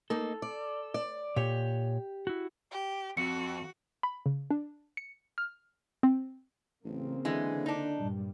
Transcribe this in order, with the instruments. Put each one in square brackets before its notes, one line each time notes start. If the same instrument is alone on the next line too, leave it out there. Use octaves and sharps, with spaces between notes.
[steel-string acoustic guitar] A#3 D#4 [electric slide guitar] A4
[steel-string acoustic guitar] D5
D5
[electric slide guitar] A#2 C#5 [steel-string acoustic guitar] G4
[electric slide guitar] E4 F#4
[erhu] G4
[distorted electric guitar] F2 [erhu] F#4 [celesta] C#7
[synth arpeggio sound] B5
C#3
D4
C#7
F6
C4
[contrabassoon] A1 [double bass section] C#3 A#3 C4
[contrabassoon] D3 [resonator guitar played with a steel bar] E3 G#3
[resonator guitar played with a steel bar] D4 D#4
[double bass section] G2 A#2 G3